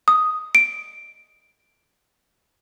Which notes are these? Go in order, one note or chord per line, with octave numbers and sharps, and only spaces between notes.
D#6
D7